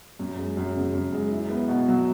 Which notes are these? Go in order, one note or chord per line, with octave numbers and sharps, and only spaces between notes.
F#2
G#3
F#2
C#3
F#2
G#3
E4
B3
B2
F#3